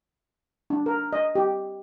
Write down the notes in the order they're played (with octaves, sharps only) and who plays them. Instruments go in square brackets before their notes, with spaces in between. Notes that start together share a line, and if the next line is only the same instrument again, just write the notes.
[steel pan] D4
A#4
D#5
G4